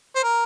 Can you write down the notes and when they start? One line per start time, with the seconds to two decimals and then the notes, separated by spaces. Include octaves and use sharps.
0.15 C5
0.23 A#4